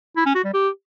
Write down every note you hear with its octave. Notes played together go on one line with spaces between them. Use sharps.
E4
C#4
F#4
G3
G4